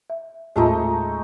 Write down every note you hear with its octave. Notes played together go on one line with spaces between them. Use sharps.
E5
D#2 A2 G#3 A3 D#4 F4